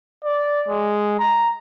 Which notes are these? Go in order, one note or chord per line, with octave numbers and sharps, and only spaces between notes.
D5
G#3
A#5